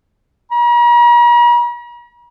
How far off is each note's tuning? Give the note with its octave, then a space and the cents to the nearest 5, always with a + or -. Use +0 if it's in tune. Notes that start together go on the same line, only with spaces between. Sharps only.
A#5 +45